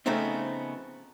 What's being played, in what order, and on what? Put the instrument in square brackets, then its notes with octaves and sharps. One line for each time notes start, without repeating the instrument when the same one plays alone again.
[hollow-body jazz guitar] C#3 F3 A3 B3 C4 D#4